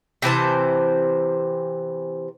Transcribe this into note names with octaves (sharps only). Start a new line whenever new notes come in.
C3 E3 C5 A5